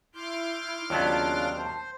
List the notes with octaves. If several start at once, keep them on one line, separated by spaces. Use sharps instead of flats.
E4 C6 D6 F6 G6
D#2 C#3 F#3 B3 D4 F4 A5
C5